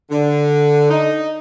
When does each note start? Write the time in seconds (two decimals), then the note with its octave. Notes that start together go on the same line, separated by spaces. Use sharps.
0.10 D3
0.90 D#4